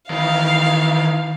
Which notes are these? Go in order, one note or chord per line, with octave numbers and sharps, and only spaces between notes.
D#3 E3 F5